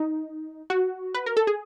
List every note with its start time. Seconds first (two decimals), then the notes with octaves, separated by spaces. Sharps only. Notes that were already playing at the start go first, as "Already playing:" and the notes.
Already playing: D#4
0.70 F#4
1.14 B4
1.26 A#4
1.37 A4
1.47 G#4